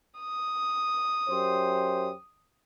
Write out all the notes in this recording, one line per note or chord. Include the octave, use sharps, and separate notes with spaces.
D#6
F#2 G4 C5